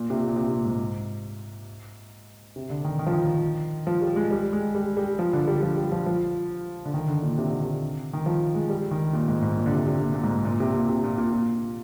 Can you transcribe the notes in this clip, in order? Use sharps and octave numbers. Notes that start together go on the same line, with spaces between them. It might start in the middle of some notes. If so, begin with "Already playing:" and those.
Already playing: A#2
C3
A#2
A#2
C3
A#2
G#2
C3
D3
D#3
D#3
F3
D#3
F3
G3
G#3
G3
G#3
G3
G3
F3
D3
G3
F3
G3
F3
F3
D3
D#3
D3
A#2
C3
D3
C3
D#3
F3
G#3
G3
D#3
A#2
G#2
G#2
A#2
D3
C3
C3
A#2
A#2
G#2
A#2
C3
A#2
C3
A#2
A#2
A#2